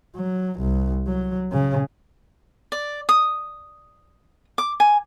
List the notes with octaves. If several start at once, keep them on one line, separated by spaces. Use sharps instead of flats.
F#3
C2
F#3
C#3
D5
D#6
D6
G#5